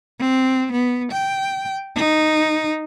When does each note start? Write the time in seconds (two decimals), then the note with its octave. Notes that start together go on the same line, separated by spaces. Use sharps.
0.19 C4
0.73 B3
1.12 G5
1.96 D#4